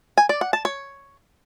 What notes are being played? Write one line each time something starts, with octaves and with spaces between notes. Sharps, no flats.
G#5
D5
F#5
A5
C#5